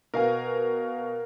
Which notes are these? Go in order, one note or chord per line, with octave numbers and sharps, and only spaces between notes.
B2 A#4 F5 G#5